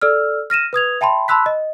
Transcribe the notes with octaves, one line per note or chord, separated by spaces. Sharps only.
A4 D5 E6 F6
F6 A#6 D#7 E7
B4 D#6 G#6 F7
E5 G5 A5 B5 C6
A5 B5 C6 E6 F#6 B6
D#5